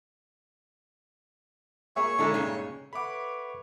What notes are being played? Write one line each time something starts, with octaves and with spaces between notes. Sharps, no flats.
A#3 G#4 C#5 E5 C#6
A#2 D3 G#3 D#4 E4 A4
G2 C#3
A4 B4 C#5 E5 F#5 B5 D6